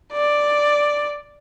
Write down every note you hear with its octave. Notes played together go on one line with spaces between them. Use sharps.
D5